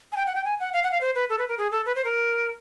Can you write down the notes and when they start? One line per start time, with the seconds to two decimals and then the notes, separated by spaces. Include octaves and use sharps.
0.12 G#5
0.17 G5
0.27 F#5
0.35 G5
0.45 G#5
0.60 F#5
0.73 F5
0.83 F#5
0.92 F5
1.01 C5
1.15 B4
1.30 A4
1.39 B4
1.48 A#4
1.58 G#4
1.72 A4
1.86 B4
1.95 C5
2.05 A#4